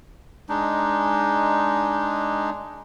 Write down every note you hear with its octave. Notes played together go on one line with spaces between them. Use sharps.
G#3 D4 D#4